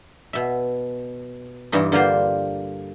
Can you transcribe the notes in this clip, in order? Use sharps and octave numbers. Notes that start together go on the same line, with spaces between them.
B2 E5
G2 E3 D#4
D3 A#3 F4 C5 C6